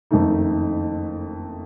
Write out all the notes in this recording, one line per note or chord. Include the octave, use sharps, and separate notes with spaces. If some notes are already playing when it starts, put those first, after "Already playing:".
F#1 F2 D#3 A3 D#4